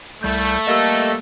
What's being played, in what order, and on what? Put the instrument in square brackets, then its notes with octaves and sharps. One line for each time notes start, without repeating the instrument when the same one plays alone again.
[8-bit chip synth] C2 G3 G6 [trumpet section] A3
[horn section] G3 A#3 A4 [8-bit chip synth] D#5 E6